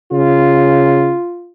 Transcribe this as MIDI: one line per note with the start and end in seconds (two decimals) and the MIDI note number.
0.12 1.14 49
0.12 1.53 65